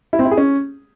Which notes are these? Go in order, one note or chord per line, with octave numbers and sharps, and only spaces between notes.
E4
C4
E4
G#4
C#4